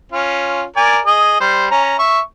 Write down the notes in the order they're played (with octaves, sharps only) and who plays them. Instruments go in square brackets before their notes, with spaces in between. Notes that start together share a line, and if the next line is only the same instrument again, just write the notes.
[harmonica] C#4 F4
A#4 D5 G#5
G#4 D#5
G3 C5
C#4 A#5
E5 C#6